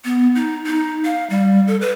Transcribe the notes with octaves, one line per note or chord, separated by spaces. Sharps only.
B3
D#4
D#4
F5
G3
A4
B4